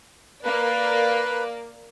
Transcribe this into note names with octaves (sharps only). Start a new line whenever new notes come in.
A#3 B4 D5